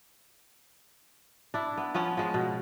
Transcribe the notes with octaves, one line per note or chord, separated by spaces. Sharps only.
D4 E4
B3
F3 B3 C#4
F3 G#3
B2